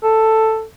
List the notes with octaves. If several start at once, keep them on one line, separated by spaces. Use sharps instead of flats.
A4